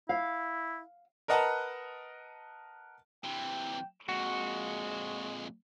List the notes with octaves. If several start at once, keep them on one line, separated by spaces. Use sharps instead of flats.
E4 F5
A#4 B4 D#5 F#5 A5 A#5
C3 E3 G5
F2 A#2 G#3 F#4